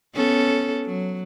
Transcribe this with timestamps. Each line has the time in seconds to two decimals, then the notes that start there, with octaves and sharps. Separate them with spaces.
0.14 B3 C#4 A4
0.85 F#3